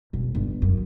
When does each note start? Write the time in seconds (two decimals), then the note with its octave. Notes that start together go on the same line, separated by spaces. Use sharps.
0.13 E1
0.35 G1
0.62 F#2